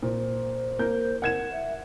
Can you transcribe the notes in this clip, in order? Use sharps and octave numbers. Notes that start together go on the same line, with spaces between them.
A#2 C5
A#3 A#4 G6
A#4 F#5 G#6 E7
E5